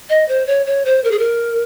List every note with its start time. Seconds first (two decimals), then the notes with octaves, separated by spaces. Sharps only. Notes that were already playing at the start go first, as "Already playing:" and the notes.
0.09 D#5
0.28 C5
0.47 C#5
0.66 C#5
0.85 C5
1.04 A#4
1.11 G#4
1.19 A#4